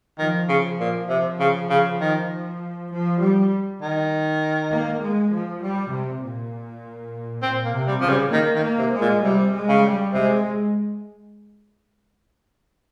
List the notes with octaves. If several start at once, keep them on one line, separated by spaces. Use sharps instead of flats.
D#3 F3
C#3
A#2
C3
C#3
C#3
D#3
F3
G3
D#3
A#3
G#3
F3
G3
C3
A#2
A#2 C4
A#3
C3
G3
C#3 F3
G3
D#3 A#3
D#3
A#3
C3
G#3
A#2
C3 G3
G#3
C#3
G3
C3 G#3